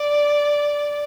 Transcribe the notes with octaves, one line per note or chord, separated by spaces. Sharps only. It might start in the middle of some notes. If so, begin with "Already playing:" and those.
Already playing: D5